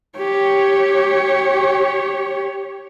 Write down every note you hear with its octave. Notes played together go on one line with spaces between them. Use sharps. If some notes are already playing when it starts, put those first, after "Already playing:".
G4 C#5